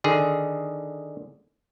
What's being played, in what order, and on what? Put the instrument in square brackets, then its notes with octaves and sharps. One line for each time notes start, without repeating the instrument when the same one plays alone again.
[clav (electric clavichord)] D3 D#3 G#4